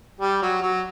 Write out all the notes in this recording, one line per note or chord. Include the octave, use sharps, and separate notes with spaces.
G3
F#3
F#3